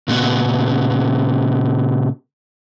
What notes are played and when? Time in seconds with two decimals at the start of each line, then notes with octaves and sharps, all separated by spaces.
0.08 A#2 C#3 B3 C#4